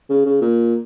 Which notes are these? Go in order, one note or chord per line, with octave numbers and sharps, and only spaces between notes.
C#3
C#3
A#2